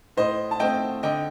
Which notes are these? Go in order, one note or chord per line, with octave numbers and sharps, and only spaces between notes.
A2 C5 D#5
A5
A3 C4 D#5 G5
D3 D#5 G5